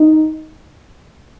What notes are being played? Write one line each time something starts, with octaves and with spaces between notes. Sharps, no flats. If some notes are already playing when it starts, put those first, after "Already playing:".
Already playing: D#4